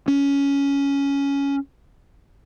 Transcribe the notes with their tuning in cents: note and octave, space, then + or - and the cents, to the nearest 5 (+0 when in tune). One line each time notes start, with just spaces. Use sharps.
C#4 +10